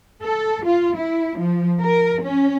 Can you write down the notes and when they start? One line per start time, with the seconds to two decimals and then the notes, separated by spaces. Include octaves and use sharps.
0.23 A4
0.65 F4
0.97 E4
1.38 F3
1.81 A#4
2.21 C#4